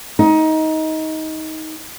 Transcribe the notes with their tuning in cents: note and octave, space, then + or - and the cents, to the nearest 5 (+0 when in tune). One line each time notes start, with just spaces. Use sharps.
D#4 +20